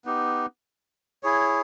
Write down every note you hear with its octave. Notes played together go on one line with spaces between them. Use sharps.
B3 D#4 G4
E4 G#4 C#5